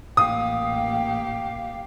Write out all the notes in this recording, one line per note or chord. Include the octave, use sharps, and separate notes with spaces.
A1 A#3 G4 F5 D#6